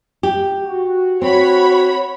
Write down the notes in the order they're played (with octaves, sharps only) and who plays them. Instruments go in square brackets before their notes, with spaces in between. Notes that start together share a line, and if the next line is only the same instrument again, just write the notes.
[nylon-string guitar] G4
[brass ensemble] F#4
[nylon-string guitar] C4 [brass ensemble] F#4 [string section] C#5 B5